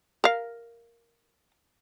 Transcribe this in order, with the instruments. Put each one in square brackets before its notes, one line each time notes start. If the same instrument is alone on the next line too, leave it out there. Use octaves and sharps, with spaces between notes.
[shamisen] A#4 F5